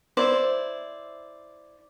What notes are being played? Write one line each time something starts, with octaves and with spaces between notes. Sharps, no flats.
E4 C5 D5 E5